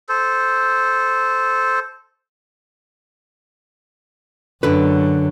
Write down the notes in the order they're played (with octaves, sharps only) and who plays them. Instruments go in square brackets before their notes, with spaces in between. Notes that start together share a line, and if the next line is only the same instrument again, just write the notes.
[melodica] A4 C5
[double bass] F#2 F#3 [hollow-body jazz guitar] D3 B4